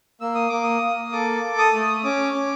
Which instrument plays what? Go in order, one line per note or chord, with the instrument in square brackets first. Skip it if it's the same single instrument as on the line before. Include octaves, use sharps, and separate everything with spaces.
[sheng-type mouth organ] A#3 E6
D#6
A#3 D6
D#6
A#3
A4 D6
A4
D#6
A3
C#4 D6
C#4